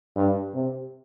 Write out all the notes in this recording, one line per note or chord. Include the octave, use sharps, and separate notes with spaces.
G2
C3